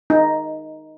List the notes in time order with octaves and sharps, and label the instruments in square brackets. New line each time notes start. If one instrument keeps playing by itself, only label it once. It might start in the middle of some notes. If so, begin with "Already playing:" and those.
[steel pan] D#4